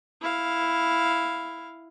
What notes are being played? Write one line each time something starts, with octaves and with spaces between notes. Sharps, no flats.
E4 F5